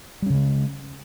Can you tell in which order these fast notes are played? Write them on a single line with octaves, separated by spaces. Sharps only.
G3 C#4 C#3 G#3